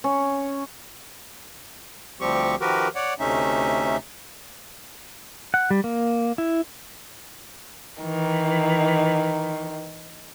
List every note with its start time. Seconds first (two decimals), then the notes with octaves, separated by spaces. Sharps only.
0.04 C#4
2.20 D2 F3 G3 C4 G4 C#6
2.61 D#3 F3 F#4 G4 A#4 B4
2.95 C#5 D5 F#5
3.20 D2 C3 A3 C#4 D#4 E5
5.54 F#5
5.71 G3
5.84 A#3
6.38 E4
8.02 D#3 E3